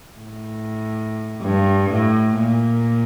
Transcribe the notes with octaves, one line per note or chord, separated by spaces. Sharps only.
A2
G2
A2
A#2